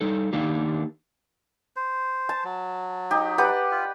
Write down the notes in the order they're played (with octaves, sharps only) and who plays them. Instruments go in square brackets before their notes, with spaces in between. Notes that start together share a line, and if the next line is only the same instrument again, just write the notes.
[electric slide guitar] G3 D#4 A4
D#3 A#3 D4 D#4 G4
[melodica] C5
[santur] A5
[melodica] F#3
[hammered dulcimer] D#4 G4
[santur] G4 B4 F#5 [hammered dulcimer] D5
[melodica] F4